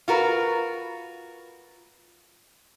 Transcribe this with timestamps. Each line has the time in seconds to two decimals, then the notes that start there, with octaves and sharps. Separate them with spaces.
0.08 F4 F#4 A#4 B4